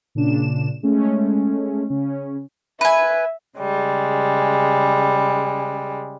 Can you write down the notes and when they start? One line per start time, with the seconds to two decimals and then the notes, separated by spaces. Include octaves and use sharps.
0.15 A#2 C#3 D4 E7
0.83 G#3 A3 C#4
1.90 C#3 C#4
2.81 B4 E5 G#5
3.58 C#3 G3 G#3